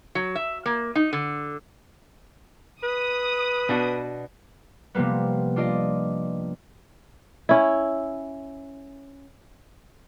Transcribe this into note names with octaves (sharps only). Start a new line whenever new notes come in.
F#3
E5
A#3
D#4
D3
B4 D#6
B2 D4 F#4
C3 F3 G3 A#3 B3
D4 F4 D5 D#5
C#4 E4